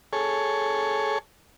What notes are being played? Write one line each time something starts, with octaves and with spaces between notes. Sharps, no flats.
G#4 A4 C#5